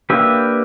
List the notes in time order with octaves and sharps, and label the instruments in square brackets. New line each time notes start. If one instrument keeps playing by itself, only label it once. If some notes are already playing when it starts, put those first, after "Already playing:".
[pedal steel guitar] A#3 D4 G4 B4 E5